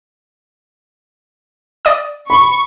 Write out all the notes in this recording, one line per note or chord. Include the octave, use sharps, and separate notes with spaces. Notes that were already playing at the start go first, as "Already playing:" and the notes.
D5 D#6
B5 C#6